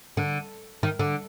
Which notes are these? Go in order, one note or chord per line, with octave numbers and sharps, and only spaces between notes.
D3
D#3
D3